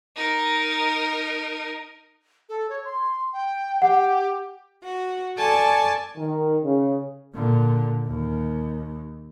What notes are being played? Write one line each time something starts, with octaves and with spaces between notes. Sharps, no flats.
D#4 A#4
A4
C#5
C6
G5
G4 F#5
F#4
A4 D5 G#5 A5 C#6
D#3
C#3
A#2 D3
D#2